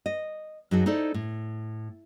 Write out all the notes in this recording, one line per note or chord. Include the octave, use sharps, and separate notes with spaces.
D#5
F#2 F#3 D#4 G#4 A4
D#4 E4 A4 C5 D5
A2